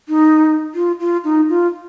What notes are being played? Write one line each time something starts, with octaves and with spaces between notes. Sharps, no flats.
D#4
F4
F4
D#4
F4